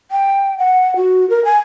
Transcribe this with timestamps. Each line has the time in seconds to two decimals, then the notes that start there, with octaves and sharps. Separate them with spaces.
0.11 G5
0.59 F#5
0.96 F#4
1.30 A#4
1.45 G#5